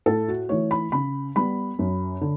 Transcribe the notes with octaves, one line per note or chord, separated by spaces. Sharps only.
A2 A4
F#4
E3 A3 C#5
B5
C#3 B5
G3 B3 B5
F#2
D3